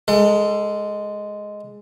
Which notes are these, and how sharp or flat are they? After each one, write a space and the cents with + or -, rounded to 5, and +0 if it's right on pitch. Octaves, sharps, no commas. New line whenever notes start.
G#3 +0 A4 +30